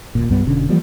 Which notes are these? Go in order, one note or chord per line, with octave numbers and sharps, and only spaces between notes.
D1 G#1 A#2
C2 G2 G3 B3
F1 B2 D3 C#4
E3 F3 G3 A#3